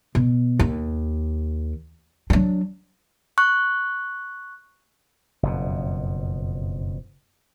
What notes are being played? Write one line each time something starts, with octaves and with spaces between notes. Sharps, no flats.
B2
D#2
F#3 D4
C#6 F#6
F#1 F2 B2